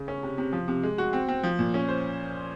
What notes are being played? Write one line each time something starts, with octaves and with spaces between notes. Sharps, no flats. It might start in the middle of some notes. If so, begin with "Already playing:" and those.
Already playing: C#3
C#4
C3
C3
F3
C3
G#3
F#4
C4
C4
F3
A#2
C#4
C5